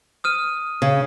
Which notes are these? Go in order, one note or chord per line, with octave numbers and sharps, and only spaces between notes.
D#6 F6 D#7
C#3